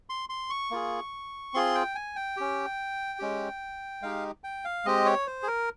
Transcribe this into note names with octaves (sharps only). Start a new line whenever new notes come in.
C6
C6
C#6
A#3 F4 G#4
C4 F4 G#4 C6
G5
G#5
G5
C#4 G4
G#3 C#4 G4
G#3 D#4 G4 F5
G5
F5
G#3 C4 G4 D#5
C#5
C5
G#4
A#4